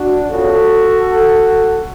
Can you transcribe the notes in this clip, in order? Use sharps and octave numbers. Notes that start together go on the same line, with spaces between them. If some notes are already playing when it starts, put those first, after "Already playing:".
Already playing: D4 F#4
F2 C#3 F3 F#4 A4